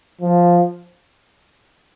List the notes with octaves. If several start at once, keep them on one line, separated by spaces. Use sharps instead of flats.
F3